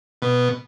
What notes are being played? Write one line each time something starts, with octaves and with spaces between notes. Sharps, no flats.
B2